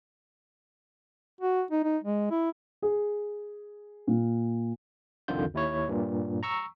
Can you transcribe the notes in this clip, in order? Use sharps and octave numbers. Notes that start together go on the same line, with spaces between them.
F#4
D#4
D#4
G#3
E4
G#4
A#2
C2 F2 D3 D#3 F4 G6
D#2 E4 C#5
G2 A#2
A#5 C#6 E6